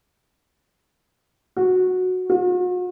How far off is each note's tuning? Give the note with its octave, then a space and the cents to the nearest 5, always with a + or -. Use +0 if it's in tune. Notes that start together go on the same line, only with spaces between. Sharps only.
F#4 -10
F#4 -45